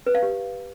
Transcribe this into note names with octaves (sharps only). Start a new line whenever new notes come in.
B4
F5
G4